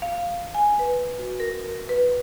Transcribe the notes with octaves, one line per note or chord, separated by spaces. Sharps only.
F5
G#5
B4
F#4
A#4
B4